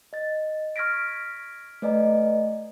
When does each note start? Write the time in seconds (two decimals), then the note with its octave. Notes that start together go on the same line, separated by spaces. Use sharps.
0.13 D#5 A6
0.76 C#6 F6 G#6 A#6 B6 D7
1.82 A3 B4 D5 D#5 G#5 A#5